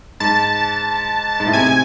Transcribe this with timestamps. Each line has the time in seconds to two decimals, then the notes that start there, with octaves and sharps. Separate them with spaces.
0.20 G#2 A5
1.40 G#2
1.46 A2
1.53 C3 G#5